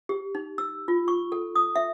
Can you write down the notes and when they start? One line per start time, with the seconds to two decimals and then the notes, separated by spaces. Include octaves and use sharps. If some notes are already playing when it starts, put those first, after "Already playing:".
0.09 G4
0.35 D#4
0.58 E6
0.88 F4
1.08 C#6
1.32 A4
1.55 D#6
1.76 E5